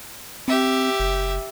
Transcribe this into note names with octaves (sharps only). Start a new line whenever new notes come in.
C4 G4 E5
F#1